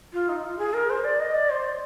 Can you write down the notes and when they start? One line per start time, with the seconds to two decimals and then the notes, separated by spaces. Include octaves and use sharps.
0.13 F4
0.29 D#4
0.45 F4
0.59 G#4
0.74 A#4
0.90 C5
1.04 D5
1.20 D#5
1.34 D5
1.50 C5